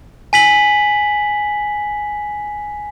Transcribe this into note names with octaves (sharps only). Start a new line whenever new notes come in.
G#5 B6 F#7